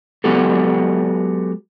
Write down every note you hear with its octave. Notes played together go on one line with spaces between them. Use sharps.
F#3 G#3 B3 F#4 G4 A4